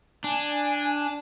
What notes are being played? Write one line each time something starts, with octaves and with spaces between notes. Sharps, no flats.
D4 G#5